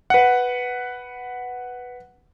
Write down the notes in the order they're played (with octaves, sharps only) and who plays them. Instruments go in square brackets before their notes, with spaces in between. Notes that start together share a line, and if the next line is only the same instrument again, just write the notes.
[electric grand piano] B4 F#5